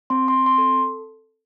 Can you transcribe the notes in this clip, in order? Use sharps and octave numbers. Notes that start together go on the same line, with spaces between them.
C4 C6
C6
C4
C6
A4